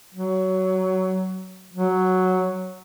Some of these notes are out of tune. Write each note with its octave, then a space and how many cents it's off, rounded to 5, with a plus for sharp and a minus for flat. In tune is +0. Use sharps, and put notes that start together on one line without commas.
F#3 +15
F#3 +0